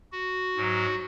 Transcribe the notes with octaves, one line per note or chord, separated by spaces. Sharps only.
F#4
G#2 F#3